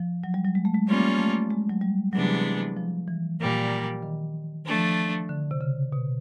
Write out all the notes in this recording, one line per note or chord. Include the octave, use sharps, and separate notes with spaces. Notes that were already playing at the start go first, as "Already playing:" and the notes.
Already playing: F3
F#3
G3
F#3
G#3
A3
G#3
G3 A#3 C#4 F4
A3
G#3
F#3
G3
C3 E3 F#3 G#3 B3 D4
F3
E3
A#2 G3 A#3
D#3
F3 A3 D4
D3
C3
C#3
B2